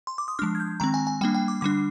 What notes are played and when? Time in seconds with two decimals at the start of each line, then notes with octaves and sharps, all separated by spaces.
0.07 C6
0.18 D6
0.28 D#6
0.39 F3 G#3 D4 F6
0.55 G#6
0.60 G6
0.80 D#3 G#3 C4 A#5
0.94 G#5
1.07 G#5
1.21 G3 A#3 D4 G5
1.34 G5
1.48 D6
1.61 D3 G3 D4 D6